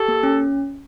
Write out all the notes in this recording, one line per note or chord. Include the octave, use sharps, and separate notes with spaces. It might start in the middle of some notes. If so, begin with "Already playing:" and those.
Already playing: G4 A4
A#3
C#4